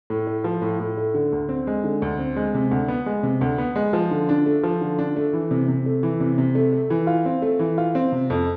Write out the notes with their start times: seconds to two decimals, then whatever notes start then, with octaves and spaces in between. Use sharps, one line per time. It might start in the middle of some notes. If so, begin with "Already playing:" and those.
0.10 A2
0.27 A3
0.44 F3
0.62 A2
0.80 A2
0.97 A3
1.14 D3
1.32 D2
1.49 C4
1.67 G#3
1.84 D3
2.02 D2
2.19 C4
2.36 G#3
2.54 C3
2.71 D2
2.88 B3
3.06 G#3
3.23 C3
3.41 D2
3.58 B3
3.76 G#3
3.93 F3
4.11 D3
4.29 D4
4.46 A3
4.63 F3
4.81 D3
4.99 D4
5.16 A3
5.33 E3
5.51 C3
5.68 C3
5.86 A3
6.03 E3
6.20 C3
6.38 C3
6.55 A3
6.72 A3
6.90 E3
7.07 F4
7.25 C4
7.42 A3
7.59 E3
7.78 F4
7.95 C4
8.12 C3
8.30 F2